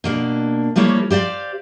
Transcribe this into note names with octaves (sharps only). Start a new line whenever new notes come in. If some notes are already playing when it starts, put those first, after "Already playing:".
B2 A#3 D4
F3 G3 A3 A#3 E4 C#5
G4 C5 D5 F5